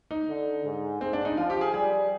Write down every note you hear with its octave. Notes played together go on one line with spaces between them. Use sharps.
D#4
D3
G#2
G#2 C4
D4
D#4
F3 F4
G4
G#4
G3 G#4